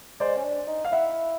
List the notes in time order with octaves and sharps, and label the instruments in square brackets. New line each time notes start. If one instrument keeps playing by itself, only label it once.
[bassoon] G#3 [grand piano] C5 D5
[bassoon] C#4
D4
D#4
[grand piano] F5
[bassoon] E4 [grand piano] E5 F#5